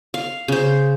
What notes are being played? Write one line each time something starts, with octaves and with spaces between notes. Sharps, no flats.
F5
C#3 C5